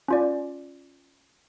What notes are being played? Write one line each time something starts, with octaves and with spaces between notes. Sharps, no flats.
C#4 F4 D5